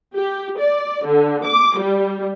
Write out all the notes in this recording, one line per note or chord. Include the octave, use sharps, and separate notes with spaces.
G4
D5
D3
D6
G3